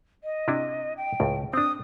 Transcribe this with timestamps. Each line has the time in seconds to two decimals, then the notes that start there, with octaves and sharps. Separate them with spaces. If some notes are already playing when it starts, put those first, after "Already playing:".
0.24 D#5
0.48 C3 D4 E4
0.97 G5
1.20 C#2 A2
1.53 C4 D4 D#6